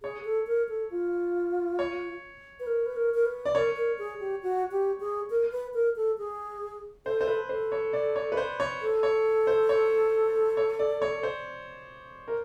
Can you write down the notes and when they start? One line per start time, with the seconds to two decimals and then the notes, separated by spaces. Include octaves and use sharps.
0.03 G#4 C#5
0.25 A4
0.47 A#4
0.69 A4
0.91 F4
1.79 C#5
2.60 B4
2.67 A#4
2.86 B4
2.96 A#4
3.14 A#4
3.26 B4
3.45 D5
3.55 A#4 C#5
3.77 A#4
3.99 G#4
4.20 G4
4.43 F#4
4.72 G4
5.00 G#4
5.30 A#4
5.52 B4
5.74 A#4
5.96 A4
6.18 G#4
7.06 A4 C5
7.21 C5
7.27 B4
7.49 A4 C5
7.72 C#5
7.93 D5
8.16 C#5
8.32 B4
8.37 C5
8.60 C#5
8.81 A4
9.03 C#5
9.47 C5
9.69 C#5
10.57 C#5
10.79 D5
11.02 C#5
11.23 C5
12.28 A#4